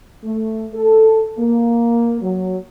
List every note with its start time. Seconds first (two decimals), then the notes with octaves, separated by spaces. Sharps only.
0.25 A3
0.74 A4
1.38 A#3
2.22 F#3